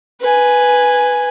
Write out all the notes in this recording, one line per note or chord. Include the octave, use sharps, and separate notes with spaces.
B4 G#5